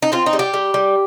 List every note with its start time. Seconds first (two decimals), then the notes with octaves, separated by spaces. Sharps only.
0.02 D#4
0.12 C4 F4
0.26 D#4
0.33 G3
0.39 G4
0.54 G3
0.74 G3